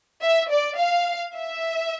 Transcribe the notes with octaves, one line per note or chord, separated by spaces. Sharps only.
E5
D5
F5
E5